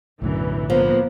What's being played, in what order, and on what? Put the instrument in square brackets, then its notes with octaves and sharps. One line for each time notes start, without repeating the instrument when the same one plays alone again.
[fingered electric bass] B1 A2 D3 [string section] F#2 E3
[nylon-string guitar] F3 [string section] A#3 B3